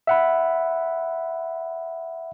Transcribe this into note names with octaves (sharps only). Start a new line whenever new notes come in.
E5 F#5 B5